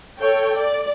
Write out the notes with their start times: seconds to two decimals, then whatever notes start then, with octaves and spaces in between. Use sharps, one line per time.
0.20 A4 C#5 G5
0.58 D5